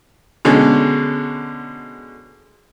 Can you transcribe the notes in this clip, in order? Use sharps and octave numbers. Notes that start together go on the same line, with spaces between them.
B2 D3 G#3 C#4